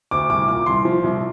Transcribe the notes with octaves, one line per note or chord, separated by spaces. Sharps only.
D2 D6
C2 D6
A#2 D6
C2 C6
F3
C2